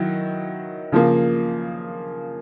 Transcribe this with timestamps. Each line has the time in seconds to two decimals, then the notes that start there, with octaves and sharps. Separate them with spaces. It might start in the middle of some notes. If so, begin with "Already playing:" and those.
Already playing: D#3 F#3 E4
0.92 C#3 F3 A#3